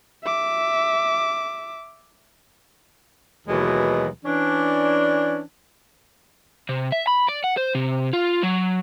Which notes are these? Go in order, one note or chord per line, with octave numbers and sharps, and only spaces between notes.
E5 D6
D#2 B2 E3 F#3 G#3
E3 C#4 D4
C3
E5
B5
D5
F#5
C5
C3
F4
F#3